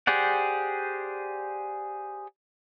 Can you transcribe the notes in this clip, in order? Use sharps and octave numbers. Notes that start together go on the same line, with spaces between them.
G4 G#4 C5 D5 F#5